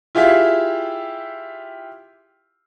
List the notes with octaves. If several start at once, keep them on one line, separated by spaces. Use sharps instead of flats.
E4 F4 G4 G#4 E5 F5